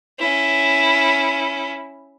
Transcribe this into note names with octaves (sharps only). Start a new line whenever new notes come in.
C#4 E4